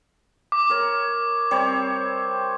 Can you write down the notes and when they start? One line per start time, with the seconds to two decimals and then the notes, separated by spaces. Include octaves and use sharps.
0.52 D6
0.70 A#4 C#5
1.51 G3 C4 C#5